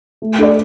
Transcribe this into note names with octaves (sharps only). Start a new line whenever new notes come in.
A3
D4 A4 D5